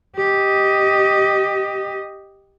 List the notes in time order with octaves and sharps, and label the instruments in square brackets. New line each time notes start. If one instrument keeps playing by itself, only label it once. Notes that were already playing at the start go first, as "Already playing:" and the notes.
[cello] G4 D#5